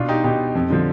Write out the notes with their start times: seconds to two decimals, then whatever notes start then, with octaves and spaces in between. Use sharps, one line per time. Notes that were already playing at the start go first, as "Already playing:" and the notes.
Already playing: B2 D4 F4
0.09 D#4 G4
0.24 B2 D#4 G4
0.55 F2
0.70 D3 F3